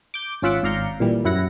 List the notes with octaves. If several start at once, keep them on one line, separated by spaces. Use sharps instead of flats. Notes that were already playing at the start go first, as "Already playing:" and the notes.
D6 G6
G#1 C#4 F4 E5 F#5 D6
G#1 D5 F5 A#5 G6 C#7
A#2 E3 G3
F#2 E4 F#5 A#6